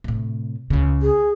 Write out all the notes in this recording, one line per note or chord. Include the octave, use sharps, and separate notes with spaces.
A2 C3
C#2 C#3
G#4